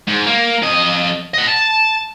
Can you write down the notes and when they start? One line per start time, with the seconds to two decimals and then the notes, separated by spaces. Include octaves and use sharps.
0.07 G#2
0.26 A#3
0.62 F2 D#5
1.34 D#5 F#5
1.48 A5